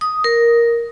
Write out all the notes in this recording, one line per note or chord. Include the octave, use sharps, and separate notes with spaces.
D#6
A#4